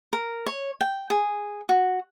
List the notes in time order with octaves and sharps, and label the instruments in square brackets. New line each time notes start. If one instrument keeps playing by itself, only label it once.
[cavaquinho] A#4
C#5
G5
G#4
F#4